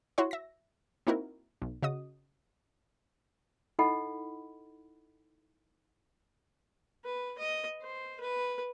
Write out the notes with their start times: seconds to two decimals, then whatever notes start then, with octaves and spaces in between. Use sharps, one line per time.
0.18 E4 F#4 C#5 C6
0.31 E5 A#6
1.07 A#3 C4 D#4 E4 F#4 A#4
1.62 B1
1.83 C#3 F#4 D#5 D#6
3.79 D#4 E4 A4 D#5 F#5 B5
7.04 B4
7.38 D#5
7.82 C5
8.20 B4